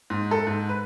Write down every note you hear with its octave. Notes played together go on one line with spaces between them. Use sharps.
G#2
A4
G#2
B4